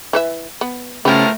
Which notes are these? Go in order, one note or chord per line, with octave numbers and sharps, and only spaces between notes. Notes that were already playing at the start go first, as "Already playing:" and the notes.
E3 B4 E5
B3
A2 C#3 F3 A3 B3 G4 A#4